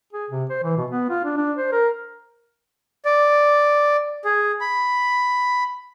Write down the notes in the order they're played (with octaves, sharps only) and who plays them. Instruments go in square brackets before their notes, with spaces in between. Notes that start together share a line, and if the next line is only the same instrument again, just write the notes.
[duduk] G#4
C3
C5
E3
B2
B3
F4
D4
D4
C5
A#4
[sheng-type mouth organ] D5
G#4
B5